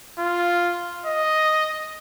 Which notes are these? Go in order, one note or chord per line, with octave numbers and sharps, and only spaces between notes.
F4
D#5